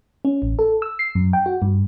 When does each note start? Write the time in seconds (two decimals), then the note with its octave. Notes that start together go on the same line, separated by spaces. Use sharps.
0.25 C#4
0.42 A1
0.59 A4
0.82 E6
0.99 C7
1.15 F#2
1.33 G5
1.46 F#4
1.62 G2